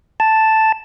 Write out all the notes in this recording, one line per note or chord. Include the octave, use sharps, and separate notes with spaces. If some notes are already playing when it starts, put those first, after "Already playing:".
A5